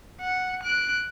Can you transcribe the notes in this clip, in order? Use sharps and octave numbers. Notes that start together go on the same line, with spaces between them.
F#5
F#6 D7